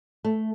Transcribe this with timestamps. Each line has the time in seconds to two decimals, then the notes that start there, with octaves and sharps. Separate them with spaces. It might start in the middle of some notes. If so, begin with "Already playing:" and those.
0.25 A3